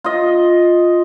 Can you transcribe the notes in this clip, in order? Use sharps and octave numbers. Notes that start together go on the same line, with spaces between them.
F4 D#5